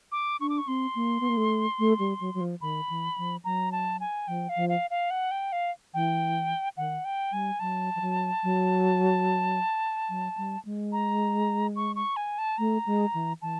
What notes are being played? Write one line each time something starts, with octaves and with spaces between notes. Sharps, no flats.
D6
D4 C#6
D6
C#6
C4 C6
A#3
B3
A#3
A3
A3
G3
F#3
F#3
F3
D#3 B5
E3
F3
F#3 A#5
A5
G#5
F3 G5
F5
F3
F5
F5
F#5
G5
F5
E3 G5
D#3 F#5
G5
G3 G#5
F#3 A5
F3
F#3
F#3
F#3
G3
G#3
A#5
C#6
C#6
G#5
A5
A3 A#5
G#3
E3
E3 A5